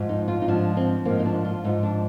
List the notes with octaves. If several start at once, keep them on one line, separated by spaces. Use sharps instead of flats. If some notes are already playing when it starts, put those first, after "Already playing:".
Already playing: G#2 F3
D#4
F4
D#4
G#2 F3 D4
C4
G#2 F3 A#3
D#4
D4
F4
G#2 F3 D#4
D4